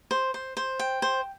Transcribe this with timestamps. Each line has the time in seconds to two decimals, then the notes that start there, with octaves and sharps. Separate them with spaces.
0.11 C5
0.34 C5
0.57 C5
0.79 G5
1.02 C5